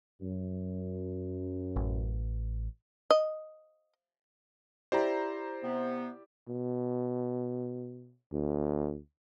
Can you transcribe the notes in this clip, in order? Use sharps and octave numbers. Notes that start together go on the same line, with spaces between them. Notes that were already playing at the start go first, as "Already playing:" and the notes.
F#2
A1
D#5
E4 G4 C5 D5 A#5
C3 B3
B2
D2